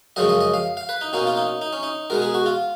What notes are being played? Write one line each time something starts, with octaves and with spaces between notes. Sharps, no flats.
F#2 C#3 F3 G#3 C#4 D#5
D#5
D#5
F5
F5
B4
D#4
B2 A#3 C#4 D#4
F4
D#4
D#4
C#4
D#4
B2 G#3 B3 A#4
G#4
F#4
F4